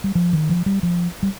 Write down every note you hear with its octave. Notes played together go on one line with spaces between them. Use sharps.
G3
F3
D#3
F3
G3
F3
G3